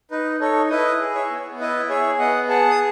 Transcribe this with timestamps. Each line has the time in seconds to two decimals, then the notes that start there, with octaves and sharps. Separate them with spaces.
0.11 D#4 B4
0.40 D#4 A4 C#5
0.70 E4 B4 D#5
1.00 G#4
1.15 C#5 E5
1.30 B3
1.60 E4 B4 D#5
1.89 G#4 C#5 E5
2.19 B3 D#5 F#5
2.49 G#4 F#5 A5
2.70 D#6